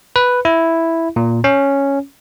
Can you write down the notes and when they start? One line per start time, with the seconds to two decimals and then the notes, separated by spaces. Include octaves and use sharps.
0.16 B4
0.45 E4
1.16 A#2
1.44 C#4